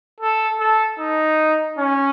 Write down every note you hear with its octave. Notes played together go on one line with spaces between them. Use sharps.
A4
A4
D#4
C#4